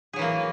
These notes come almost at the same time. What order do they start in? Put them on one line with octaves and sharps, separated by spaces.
G#4 F#3 E3 A#3